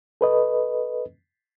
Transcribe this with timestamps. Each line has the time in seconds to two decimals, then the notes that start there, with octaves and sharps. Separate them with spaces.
0.21 A4 B4 D#5